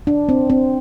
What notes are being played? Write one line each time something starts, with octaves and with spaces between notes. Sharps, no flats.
D4
C4
C4